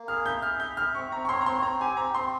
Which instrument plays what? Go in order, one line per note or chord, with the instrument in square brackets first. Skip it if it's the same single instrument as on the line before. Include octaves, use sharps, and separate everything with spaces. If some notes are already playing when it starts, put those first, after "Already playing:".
Already playing: [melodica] A#3
[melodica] G#4 [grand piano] F6
[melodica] E5 [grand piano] G6
[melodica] G#4 [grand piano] F6
[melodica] E5 [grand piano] G6
[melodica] E5 [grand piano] F6
[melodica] C4 [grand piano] C#6
[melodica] C4 [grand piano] A#5
[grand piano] C#6
[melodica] C#5 [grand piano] C6
[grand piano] A#5
[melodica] C4 [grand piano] C6
[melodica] C4 [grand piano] A#5
[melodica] G4 [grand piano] G#5
[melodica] C4 [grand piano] A#5
[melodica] C4 [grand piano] C6